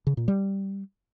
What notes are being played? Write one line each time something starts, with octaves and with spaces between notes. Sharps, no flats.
C#3
A#2
G3